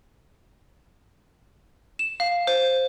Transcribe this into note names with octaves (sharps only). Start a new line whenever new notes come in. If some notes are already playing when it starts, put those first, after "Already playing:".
E7
F5
C5